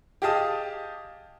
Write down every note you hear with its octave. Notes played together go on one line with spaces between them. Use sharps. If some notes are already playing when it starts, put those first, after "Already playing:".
G4 G#4 D#5 F5 A5 D#6